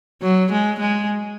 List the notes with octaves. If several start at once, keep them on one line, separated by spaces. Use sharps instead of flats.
F#3
G#3
G#3